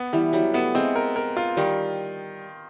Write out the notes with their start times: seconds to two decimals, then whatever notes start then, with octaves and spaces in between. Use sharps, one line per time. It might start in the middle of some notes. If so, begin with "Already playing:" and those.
Already playing: B3
0.13 E3 G3
0.33 F#3 G3
0.54 A3 B3
0.75 G#3 C4
0.96 A#4
1.16 A#4
1.37 F4
1.57 D#3 G3